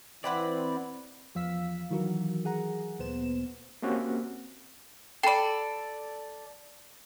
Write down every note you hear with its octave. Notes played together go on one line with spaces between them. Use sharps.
E3 C4 E4 B4 D5 F#5
E2 F3 F5 E6 B6
D#3 E3 F#3 F#4 A#4
G#4 F#5 A#5
D2 A#2 B3 C5 E7
A#3 C4 C#4 F#4 G4
A4 D5 G5 B5